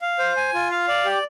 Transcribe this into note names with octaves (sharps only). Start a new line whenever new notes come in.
F5
C5
G#5
F4
F5
D5
G4